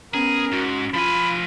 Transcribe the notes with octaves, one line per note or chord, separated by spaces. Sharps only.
B3 C#4 G#4 A#4 A#5
G#2 F#4
F3 F4 G#5 B5